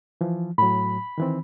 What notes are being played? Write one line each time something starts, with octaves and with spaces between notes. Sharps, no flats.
E3 F3
A2 F#3 B5
D#3 E3 C4